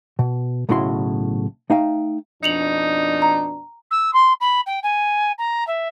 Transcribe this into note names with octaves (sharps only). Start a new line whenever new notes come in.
B2
B1 A2 C#3 E4 F#4 C6
A3 D#4 F5 G5
F2 B2 D4 D#4 C#7 F7 F#7
A#5
E6
C6
B5
G5
G#5
A#5
E5